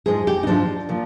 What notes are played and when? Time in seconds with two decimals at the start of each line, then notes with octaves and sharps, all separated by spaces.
0.06 G#2 F3 G#3 G#4
0.27 G4
0.43 D#4
0.47 G#2 F3 G#3 D4
0.89 A#2 F3